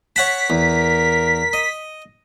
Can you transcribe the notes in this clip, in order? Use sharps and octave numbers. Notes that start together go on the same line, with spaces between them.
C#5 F#5 A5 B6
E2 A#4
D#5